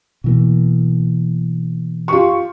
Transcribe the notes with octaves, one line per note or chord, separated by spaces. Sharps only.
B2 E3 A#3
F4 G4 C#6